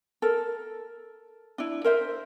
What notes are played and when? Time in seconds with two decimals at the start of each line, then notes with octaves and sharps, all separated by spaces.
0.22 A4 A#4
1.58 D4 E4
1.84 A#4 C5 E5